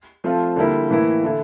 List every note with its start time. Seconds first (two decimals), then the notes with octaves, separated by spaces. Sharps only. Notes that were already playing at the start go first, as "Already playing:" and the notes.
0.24 F3 A3 C4 F4
0.56 D3 G3 A#3 E4
0.90 A2 E3 A#3 E4
1.23 D3 A3 E4